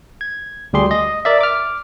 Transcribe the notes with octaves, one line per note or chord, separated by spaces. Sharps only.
G#6
D2 G3 G4 G#4 C6
D#5
A#4 D5 E5
D6 F6